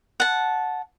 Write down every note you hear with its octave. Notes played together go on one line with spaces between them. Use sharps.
F#5 A5